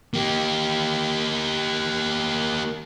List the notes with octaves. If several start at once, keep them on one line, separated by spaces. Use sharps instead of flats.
A#3 G4